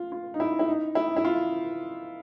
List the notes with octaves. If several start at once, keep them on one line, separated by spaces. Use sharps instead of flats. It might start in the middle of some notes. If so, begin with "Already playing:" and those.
Already playing: F4
F4
D#4
E4
E4
D#4
E4
E4
F4